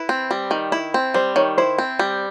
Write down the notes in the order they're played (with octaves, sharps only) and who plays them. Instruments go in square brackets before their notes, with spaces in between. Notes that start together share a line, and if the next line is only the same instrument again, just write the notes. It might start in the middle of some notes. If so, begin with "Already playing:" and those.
Already playing: [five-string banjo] E4 [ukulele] B4
[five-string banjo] C4
G3
D#3
E4
C4
[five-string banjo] G3 [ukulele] C5
[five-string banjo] D#3 [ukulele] C#5
[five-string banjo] E4 [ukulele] C5
[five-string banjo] C4
G3